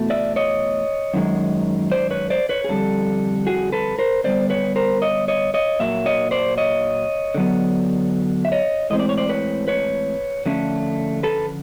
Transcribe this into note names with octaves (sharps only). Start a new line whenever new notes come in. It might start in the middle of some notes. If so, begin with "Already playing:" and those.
Already playing: E2 B2 A3
D5 E5
C#5 D#5
F#2 D#3 G#3
C5 D5
B4 C#5
C5 D5
B4 C#5
G#4
F2 D3 G3 A4
F#4 G#4
A4 B4
A#4 C5
D3 G3 B3 C5 D5
B4 C#5
A#4 C5
C#5 D#5
C#5 D#5
C#5 D#5
A#2 F#3 A#3 E5
C#5 D#5
C5 D5
C#5 D#5
D3 F#3 B3
E5
C#5 D#5
A2 E3 G#3 C4 D#5
D5
C#5
C5 D5
B4 C#5
B4 C#5
D3 F3 A3 C#4
A4 B4